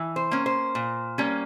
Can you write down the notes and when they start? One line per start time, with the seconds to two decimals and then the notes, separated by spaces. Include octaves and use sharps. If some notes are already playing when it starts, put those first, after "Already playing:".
Already playing: E3
0.16 C5
0.31 A#3 C#4
0.46 C5
0.75 A#2
1.18 G3 A#3 C#4